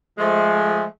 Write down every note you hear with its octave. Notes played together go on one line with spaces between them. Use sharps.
F3 G#3 A3